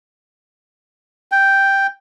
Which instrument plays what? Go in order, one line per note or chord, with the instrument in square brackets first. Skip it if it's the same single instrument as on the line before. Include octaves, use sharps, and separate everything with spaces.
[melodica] G5